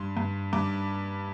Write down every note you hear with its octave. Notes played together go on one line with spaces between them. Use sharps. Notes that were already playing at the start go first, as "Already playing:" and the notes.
Already playing: G2 C6
G2
G2 D6